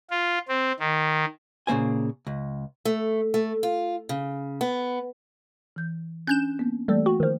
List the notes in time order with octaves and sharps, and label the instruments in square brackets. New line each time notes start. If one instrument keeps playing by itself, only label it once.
[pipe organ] F4
C4
D#3
[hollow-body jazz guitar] A#2 C#3 A#3 C5 G#5
C#2
[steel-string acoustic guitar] A3
A3
F4
C#3
B3
[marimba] E3 G6
[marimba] C#4 D4 G#5 [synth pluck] F#6 G6 E7
[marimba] A#3 B3
[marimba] E3 A3 A#3 [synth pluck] G3 A4
[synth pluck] F#4 [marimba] G5 C#6
[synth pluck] D#3 F3